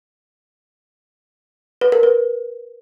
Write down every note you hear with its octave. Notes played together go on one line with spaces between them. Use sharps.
B4
A#4
B4